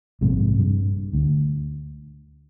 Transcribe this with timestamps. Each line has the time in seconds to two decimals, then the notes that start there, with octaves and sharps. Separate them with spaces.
0.21 A#1 G#2 C3 G#3
0.59 G2
1.13 D2